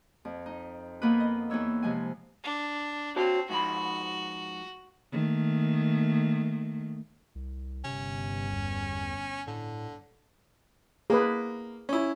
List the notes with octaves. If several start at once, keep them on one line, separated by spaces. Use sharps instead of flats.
F2
D#4
A#3 B3 D#4 F4 A#4 B4
D#5
E2 B3 D#4 C#5 E6
C3 F3 G#3 G#5
D4
C4 F#4 C#5 A5
G#2 F3 F#4 B5
D#3 A3 A#3
C2
G1 C3 C#4
E2
A2 D3
A#3 G#4 B4
C#4 E4